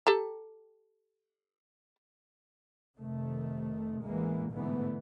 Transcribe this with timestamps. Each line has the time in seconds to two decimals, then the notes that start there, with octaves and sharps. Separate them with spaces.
0.07 G4 A4 A#5
2.99 F1 C3 D#3 A3
4.04 A1 E2 E3 G#3 A#3 B3
4.52 G#2 B2 D3 E3 A3 B3